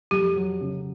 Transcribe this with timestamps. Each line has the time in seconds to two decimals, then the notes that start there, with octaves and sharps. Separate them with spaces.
0.11 F2 G4
0.36 F#3
0.61 C#3